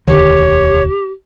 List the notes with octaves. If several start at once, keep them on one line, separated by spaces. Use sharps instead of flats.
E1 D2 D3 D#3 G4 C#5